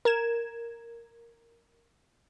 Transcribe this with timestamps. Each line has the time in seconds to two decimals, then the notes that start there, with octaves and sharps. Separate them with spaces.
0.05 A#4 G#6 E7